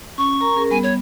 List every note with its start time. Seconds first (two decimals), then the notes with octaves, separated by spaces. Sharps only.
0.18 C#4 C#6
0.41 A#4 A#5
0.56 C#4 G#4 A#4
0.70 G3 B3 G#5
0.83 C#5